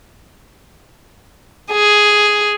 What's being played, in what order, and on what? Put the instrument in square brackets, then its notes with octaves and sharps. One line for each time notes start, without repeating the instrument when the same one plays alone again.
[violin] G#4